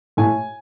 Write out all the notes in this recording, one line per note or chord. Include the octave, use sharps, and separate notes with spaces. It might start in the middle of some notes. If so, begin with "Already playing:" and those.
A2 G#5